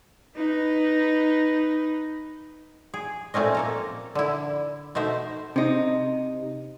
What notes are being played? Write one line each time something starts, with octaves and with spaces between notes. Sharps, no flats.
D#4 B4
G#4
A#2 A3 C4 C#4 D#5
A#3 A4 A#5
D3 E4
B2 A3 D#4 C5 E5
C3 D#4